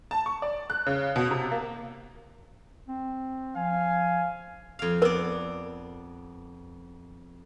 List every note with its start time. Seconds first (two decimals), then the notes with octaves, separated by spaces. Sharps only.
0.11 A5
0.26 C#6
0.42 D5
0.70 F#6
0.86 C#3
1.16 B2
1.31 C3
1.52 A#3
2.87 C4
3.56 F3 F5 G#5
4.79 F2 F5
5.02 B3 A#4 D5